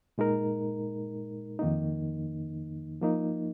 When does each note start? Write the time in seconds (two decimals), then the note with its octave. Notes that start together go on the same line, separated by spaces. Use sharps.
0.18 A#2 G#3 D#4 A#4
1.59 F2 D#3 A#3 D#4
3.01 F3 A#3 D#4